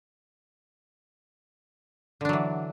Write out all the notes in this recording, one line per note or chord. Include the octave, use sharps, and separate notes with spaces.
D3 E3 F#3 D4